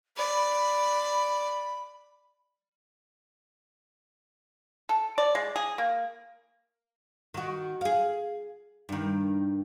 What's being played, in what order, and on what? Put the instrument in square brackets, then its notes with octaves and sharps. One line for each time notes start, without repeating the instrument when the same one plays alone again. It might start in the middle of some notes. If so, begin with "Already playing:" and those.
[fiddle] D5 [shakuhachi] B5
[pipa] A4
D5
G#3
G#4
A#3
[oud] D#3 F#4
G#4 F5
G2 D#3